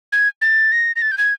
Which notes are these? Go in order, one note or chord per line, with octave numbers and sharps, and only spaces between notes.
G#6
A6
A#6
A#6
A6
G6
G#6